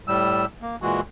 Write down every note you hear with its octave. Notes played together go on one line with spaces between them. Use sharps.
A2 G3 E6
A#3
A#2 E3 G#3 F#4